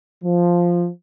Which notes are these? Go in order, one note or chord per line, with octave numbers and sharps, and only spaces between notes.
F3